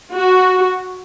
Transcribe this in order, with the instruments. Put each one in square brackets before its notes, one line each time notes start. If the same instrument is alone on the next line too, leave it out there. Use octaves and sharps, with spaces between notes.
[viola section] F#4